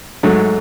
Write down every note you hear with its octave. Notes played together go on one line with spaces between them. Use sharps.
G#2 F#3 A3